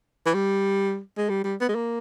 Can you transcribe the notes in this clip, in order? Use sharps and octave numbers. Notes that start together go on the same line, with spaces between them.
E3
G3
G#3
G3
G3
B3
G#3
A#3